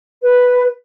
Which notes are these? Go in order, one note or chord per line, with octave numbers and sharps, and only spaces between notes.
B4